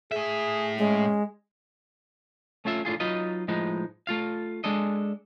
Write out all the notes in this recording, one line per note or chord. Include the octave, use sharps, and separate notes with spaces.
A2 G#4 E5
G#3 C#4
A3 C#4 F4 E5
A2 D3 F4 G#4
F#3 D#4 F4 B4 D#5
A2 F3 G#3 D#4 B4
A3 F4 F5
G#3 D4 A4 D#5